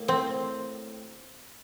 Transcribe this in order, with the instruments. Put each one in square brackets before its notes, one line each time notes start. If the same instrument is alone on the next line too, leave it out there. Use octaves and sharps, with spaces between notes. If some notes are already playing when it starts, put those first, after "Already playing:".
Already playing: [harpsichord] A2 A#3
[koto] C4